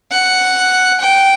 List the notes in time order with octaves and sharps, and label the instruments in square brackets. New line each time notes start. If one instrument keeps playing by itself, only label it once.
[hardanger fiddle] F#5
G5